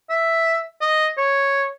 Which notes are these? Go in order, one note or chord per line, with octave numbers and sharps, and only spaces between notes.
E5
D#5
C#5